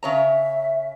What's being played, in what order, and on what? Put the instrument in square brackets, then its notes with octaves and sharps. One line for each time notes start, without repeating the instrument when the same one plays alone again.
[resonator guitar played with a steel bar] C#3 C#5 A#5 [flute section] E5